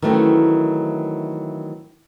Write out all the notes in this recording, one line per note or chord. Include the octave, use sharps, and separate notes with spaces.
D#3 E3 F#3 A3 C4 C#4